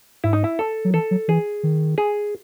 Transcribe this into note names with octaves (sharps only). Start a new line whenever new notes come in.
G#2 E4
D#4
E4
A4
F#3
E3 A4
F#3
E3 G#4
D#3
G#4